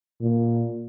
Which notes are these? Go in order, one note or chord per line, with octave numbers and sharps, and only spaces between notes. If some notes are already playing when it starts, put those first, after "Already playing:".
A#2